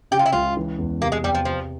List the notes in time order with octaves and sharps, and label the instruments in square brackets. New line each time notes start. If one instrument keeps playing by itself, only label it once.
[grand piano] C#3 [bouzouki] G4
[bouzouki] F4
E4
[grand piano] C#2 [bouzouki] F4
[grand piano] E3
E2
[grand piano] C3 [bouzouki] A#3
[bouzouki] G#3
[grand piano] E2 [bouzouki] G3
[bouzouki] F3
[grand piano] C3 [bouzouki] F3